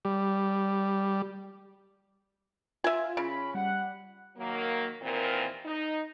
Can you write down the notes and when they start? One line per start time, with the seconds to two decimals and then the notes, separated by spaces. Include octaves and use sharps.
0.05 G3
2.84 F4 E5 G#5
3.17 C#3 C#4 B5
3.55 G3 F#5
4.37 D#3 F#3 A#3
5.02 D#2 A#2 E3 C4 A#4
5.65 D#4